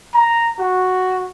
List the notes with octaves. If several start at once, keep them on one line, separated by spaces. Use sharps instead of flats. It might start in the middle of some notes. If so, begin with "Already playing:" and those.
A#5
F#4